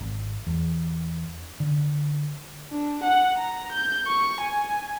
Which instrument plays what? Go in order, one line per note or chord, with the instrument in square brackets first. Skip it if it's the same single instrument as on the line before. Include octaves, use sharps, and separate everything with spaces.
[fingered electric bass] G#1
E2
D3
[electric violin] D4
F#5
A#5
G6
C#6
G#5